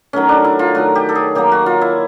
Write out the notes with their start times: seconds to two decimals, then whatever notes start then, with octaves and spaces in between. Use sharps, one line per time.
0.13 D#3 F#3 A3 C#4
0.29 D4
0.44 E4
0.59 F4
0.75 D#3 F#3 A3 F#4
0.95 G4
1.09 A4
1.15 G#4
1.35 D#3 F#3 A#3 G4
1.52 F#4
1.66 F4
1.81 E4